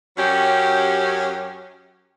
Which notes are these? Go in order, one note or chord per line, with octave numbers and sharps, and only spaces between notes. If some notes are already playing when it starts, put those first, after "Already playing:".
F#2 F#3 C#4 G4